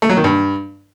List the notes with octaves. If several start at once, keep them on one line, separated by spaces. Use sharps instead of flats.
A3
F#3
D#3
G2